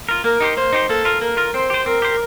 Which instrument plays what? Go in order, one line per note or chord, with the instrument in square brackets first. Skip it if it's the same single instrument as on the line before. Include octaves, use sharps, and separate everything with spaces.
[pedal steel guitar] F4 A#4
[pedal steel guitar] A#3 [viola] A#4
[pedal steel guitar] D#4 G4 C5
[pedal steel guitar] A#3 [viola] C5
[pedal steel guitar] D#4 G4 C5
[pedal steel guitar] A#3 [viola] A4
[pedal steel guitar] F4 A#4
[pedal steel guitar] A#3 [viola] A#4
[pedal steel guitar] F4 A#4
[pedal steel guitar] C4 [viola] C5
[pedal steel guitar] G4 C5
[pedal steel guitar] C4 [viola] A#4
[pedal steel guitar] G4 C5